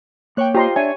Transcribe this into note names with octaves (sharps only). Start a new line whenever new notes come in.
A#3 C#5 G5 C#6 F#6
F4 G4 C5 D#5 A#5 C6
D4 C#5 E5 G#5